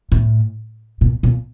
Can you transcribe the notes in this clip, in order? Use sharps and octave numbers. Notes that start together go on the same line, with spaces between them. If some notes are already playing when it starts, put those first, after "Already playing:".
A2
A#2
A#2